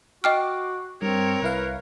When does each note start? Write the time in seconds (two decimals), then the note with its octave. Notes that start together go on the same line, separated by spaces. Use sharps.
0.24 F#4 D#5 G5 D6 F6
1.02 G2 C4 A#4 C#5
1.42 C2 E4 B4 F5